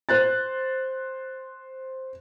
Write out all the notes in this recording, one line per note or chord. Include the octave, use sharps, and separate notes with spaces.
C5 F#6 A6